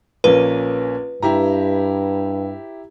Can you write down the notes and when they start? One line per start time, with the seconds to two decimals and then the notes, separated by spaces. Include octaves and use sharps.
0.24 A#1 A#3 C#4 B4
1.22 G2 E4 G4 A#5